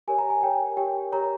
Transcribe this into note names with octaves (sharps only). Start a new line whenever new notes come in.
G4 A#4 C#5 G#5
A#5
G#5
G4 A#4 C#5 G5
G4 A#4 C#5 G5
G4 A#4 C#5 A#5